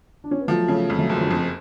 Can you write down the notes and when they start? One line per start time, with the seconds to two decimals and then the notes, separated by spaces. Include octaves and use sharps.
0.24 D4
0.31 C#4
0.40 B3
0.48 F3 F#3 A3
0.68 C#3 A3 C#4
0.90 F2
0.99 F#3 A3
1.09 F#1 F3
1.20 D3 F#3
1.31 F2